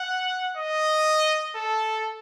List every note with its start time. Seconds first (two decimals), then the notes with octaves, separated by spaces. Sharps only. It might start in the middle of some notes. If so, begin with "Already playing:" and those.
Already playing: F#5
0.57 D#5
1.55 A4